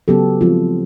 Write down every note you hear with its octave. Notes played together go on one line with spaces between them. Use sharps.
C#3 F#3 B3 G4 A4
F3 G#3 C4 F4